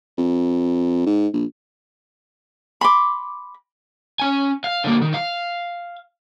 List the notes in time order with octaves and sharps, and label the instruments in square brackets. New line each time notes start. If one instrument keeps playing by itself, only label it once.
[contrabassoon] F2
G#2
A#1
[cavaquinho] B5 C6 D6
[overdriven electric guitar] C#4 G#5
F5
D3 A#3
D#3
F5